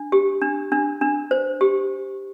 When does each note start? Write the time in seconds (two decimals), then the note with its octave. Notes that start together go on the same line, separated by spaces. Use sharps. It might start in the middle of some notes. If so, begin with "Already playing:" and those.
Already playing: D4
0.12 G4
0.41 D4
0.72 D4
1.01 D4
1.31 C5
1.61 G4